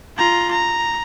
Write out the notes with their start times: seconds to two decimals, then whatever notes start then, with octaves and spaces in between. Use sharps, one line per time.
0.18 F4 A#5
0.51 A#5